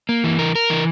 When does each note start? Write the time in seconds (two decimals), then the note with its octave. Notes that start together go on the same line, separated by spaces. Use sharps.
0.09 A#3
0.24 E3
0.39 A#4
0.55 A#4
0.70 E3